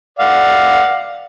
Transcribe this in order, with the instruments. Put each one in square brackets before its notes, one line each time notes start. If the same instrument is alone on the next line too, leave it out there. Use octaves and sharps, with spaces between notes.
[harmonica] D5 F5 F#5